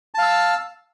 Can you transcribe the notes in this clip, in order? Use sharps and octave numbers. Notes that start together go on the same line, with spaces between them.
F5 A5 E6